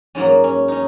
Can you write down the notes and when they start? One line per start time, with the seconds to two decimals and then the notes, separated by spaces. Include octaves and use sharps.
0.15 G#2 F#3 A#3 C#4
0.44 C#4
0.68 C#4 D#4